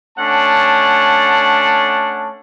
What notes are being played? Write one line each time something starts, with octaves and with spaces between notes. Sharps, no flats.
A3 C#4 D4 F#5 A5